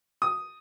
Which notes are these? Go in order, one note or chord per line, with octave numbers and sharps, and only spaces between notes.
D#6